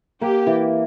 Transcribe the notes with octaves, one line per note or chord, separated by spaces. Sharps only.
A#3 G4
E3